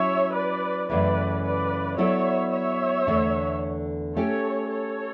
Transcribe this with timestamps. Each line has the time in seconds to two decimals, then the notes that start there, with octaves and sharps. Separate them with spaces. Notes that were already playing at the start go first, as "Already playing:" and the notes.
Already playing: F#3 C#4 E4 C#5 E5
0.34 B4 D5
0.89 F#2 C#3 E3 A3 B4 D5
1.43 B4 D5
1.98 F#3 B3 E4 A4 C#5 D5 E5
2.52 C#5 E5
3.07 E2 D3 A3 D4
4.16 A3 C#4 G4 A4 C#5
4.70 A4 C#5